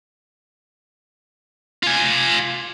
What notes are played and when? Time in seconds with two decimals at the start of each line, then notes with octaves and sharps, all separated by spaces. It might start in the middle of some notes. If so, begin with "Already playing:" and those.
1.83 F4 G#5